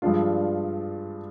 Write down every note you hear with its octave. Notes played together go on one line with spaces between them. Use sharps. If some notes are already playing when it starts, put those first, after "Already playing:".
G2 F3 G#3 D4 F4